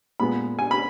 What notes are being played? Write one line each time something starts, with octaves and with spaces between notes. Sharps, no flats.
A#2 G#3 B3 B5
G#5
B5